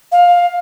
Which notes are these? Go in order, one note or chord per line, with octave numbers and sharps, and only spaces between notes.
F5